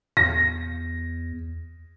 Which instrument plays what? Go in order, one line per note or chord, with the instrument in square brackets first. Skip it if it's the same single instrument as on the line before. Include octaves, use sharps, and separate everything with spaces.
[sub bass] E2 [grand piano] A#6